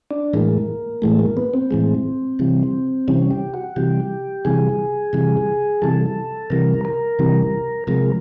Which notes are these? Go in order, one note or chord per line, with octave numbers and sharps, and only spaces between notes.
D4
A2 E3 G#3 A#3
A2 E3 G#3 A3
A#3
B3
C4
A2 E3 G#3
C3 E3 G3
C3 E3 G3 C#4
G4
F#4
C3 E3 G3 G4
C3 E3 G3 G#4
C3 E3 G3
C3 E3 G3 A4
C3 E3 G3 A#4
A#4
C3 E3 G3
C3 F3 G#3 A#4